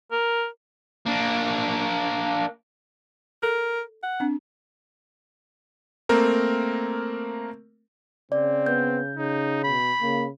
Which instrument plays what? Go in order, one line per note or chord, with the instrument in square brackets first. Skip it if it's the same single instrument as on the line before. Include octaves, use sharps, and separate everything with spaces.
[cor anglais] A#4
[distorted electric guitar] A#3 D4
[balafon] A4 [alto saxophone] A#4
[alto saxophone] F#5
[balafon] C4 D4
[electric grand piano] A3 A#3 C4 A#4
[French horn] C#3 [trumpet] C4 [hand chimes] D5
[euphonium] B3 [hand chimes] G6
[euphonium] C#3 [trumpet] D#4
[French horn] B2 [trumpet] B5
[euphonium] C#3 [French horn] A#3